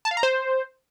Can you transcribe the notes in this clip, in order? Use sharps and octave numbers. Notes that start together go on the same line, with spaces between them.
A5
F5
A#5
C5